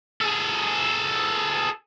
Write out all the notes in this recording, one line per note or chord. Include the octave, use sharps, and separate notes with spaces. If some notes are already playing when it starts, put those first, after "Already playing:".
G#4 A4